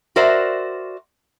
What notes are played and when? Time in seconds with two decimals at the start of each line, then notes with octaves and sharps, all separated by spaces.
0.16 F#4 A#4 C5 D5 E5